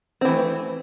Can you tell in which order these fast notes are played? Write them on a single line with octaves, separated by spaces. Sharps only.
C4 E3 A3